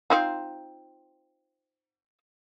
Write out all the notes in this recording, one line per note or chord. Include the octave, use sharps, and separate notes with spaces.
C4 D#4 F4